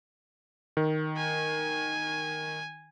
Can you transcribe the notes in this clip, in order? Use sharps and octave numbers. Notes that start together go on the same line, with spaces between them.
D#3
G#5